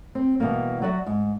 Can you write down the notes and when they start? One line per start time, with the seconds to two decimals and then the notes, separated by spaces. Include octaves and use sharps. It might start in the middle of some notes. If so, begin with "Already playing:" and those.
0.15 C4
0.40 B2 E3 G3 A#3
0.82 F#3 F#4 D5 E5 F#5
1.07 G#2